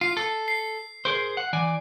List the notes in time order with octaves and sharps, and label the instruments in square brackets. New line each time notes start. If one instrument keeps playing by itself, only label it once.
[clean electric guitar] F4 [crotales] C7
[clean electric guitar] A4
[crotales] C7
[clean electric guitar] G#4 A#4 C5
F#5
E3 D5 G#5